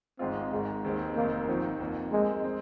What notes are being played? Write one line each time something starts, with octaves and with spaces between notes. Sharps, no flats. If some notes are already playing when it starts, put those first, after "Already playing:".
G#1 G#2 G#3 C4 F4
G#1 G#2 D#3 G#3
D#2 D#3 G#3 C4
F1 D#2 D#3 A#3 C4 D#4
G#1 G#2 D#3 F3 C4 D#4
F2 D#3 A#3 F4
F2 D#3 G#3 C4
G#3 C4